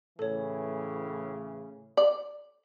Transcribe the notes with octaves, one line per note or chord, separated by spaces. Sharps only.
A2 C#3 E3 A4 C#5
D5